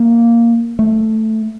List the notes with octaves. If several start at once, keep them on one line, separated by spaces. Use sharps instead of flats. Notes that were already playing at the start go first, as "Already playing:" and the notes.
Already playing: A#3
A3